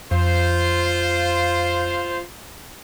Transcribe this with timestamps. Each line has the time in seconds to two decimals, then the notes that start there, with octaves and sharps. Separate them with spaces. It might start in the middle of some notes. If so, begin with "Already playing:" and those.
0.11 F2 F4 C5